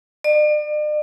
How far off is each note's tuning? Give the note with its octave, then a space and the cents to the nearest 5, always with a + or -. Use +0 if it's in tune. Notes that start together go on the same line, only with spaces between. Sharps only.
D5 +40